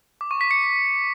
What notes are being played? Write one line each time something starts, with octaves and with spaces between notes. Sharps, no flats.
D6
C#6
B6
C#7